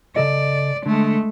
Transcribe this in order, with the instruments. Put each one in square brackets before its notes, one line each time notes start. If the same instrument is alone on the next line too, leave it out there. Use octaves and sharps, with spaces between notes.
[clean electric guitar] C#3 A4 D#5 [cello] D5
[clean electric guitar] D3 [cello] G#3 A3